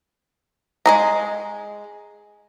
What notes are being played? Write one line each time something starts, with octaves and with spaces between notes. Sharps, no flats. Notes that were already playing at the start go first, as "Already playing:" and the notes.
G#3 G#4 A#5